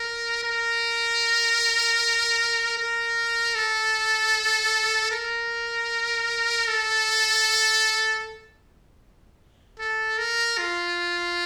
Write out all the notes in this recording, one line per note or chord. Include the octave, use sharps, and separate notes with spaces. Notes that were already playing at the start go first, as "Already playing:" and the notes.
Already playing: A#4
A#4
A#4
A4
A#4
A4
A4
A#4
F4